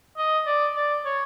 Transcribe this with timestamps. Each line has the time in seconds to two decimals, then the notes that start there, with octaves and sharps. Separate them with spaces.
0.18 D#5
0.46 D5
0.76 D5
1.05 C#5